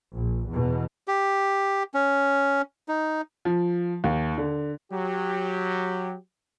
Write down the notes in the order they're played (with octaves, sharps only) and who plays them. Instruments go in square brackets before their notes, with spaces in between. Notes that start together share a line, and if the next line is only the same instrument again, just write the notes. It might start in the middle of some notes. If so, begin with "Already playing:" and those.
[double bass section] A#1
E2 B2
[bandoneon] G4
C#4
D#4
[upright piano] F3
D#2
D3
[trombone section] F#3 G4